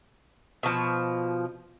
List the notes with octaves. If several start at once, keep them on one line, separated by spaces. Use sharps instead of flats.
B2 F3